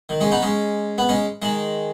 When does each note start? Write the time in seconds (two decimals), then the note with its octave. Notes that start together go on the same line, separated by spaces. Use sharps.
0.09 D#3
0.20 G#3 C#4
0.31 B3 D#4
0.42 G#3 C#4
0.98 B3
1.09 G#3 C#4
1.42 D#3 G#3